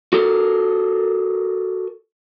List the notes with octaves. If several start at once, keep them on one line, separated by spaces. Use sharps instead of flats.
F#4 A4 A#4